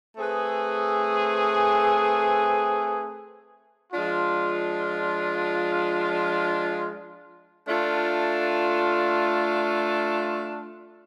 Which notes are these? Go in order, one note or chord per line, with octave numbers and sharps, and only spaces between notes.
A3 C4 G#4 B4
F3 G#3 D4 F4
A3 D4 F4